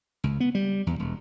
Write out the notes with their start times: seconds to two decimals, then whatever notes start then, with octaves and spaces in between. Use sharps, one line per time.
0.24 C#2
0.40 B3
0.55 G3
0.87 E2
0.99 E1